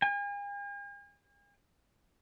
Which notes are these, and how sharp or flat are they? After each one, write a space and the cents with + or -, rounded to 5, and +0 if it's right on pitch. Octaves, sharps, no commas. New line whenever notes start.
G#5 -45